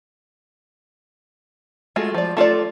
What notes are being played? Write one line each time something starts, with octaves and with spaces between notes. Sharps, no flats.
G#3 A3 F4 F#4
F3 D5
A3 F4 A4 D5